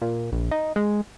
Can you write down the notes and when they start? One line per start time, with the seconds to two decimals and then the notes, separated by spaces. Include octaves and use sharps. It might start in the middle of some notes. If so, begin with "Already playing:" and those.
0.02 A#2
0.32 A#1
0.51 D#4
0.76 G#3